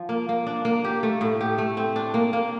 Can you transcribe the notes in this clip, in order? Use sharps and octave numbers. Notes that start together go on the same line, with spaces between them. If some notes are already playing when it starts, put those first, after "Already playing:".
Already playing: F3
A#3
A#3
D4
A#3
G4
A3
A2
G4
A3
C4
D4
A#3
A#3